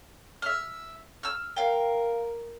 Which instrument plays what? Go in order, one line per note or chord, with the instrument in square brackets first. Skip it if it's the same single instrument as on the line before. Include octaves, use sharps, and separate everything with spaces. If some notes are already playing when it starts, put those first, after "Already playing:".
[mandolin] E5 F6
E6 F6
[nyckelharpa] A#4 [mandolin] F5 G5